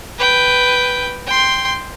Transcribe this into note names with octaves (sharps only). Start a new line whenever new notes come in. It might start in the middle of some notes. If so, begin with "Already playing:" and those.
B4 G5
G5 C6